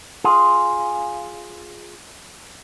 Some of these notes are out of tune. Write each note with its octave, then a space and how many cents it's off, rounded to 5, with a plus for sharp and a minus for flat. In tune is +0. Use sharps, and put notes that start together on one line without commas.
F4 +0 G#4 +0